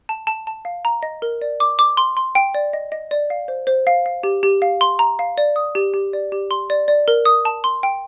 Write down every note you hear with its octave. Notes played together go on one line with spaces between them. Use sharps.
A5
A5
A5
F5
A#5
D#5
A#4
D5
D6
D6
C6
C6
G5
D5
D#5
D#5
D5
F5
C5
C5
F5
F5
G4
G4
F5
C6
A#5
F5
D5
D#6
G4
G4
D5
G4
C6
D5
D5
A#4
D#6
A5
C6
G5